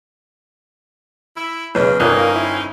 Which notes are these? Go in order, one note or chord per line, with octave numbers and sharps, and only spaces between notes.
E4
B1 E2 C#3 B4 D#5
G1 A#2 C4 C#4 D#4 D#6 F#6
A#3
E4